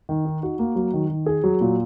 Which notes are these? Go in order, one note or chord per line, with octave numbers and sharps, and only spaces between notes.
D#3
D#4
F#4
A#3
F#3
D#3
D#3
G#4
F#3
A#2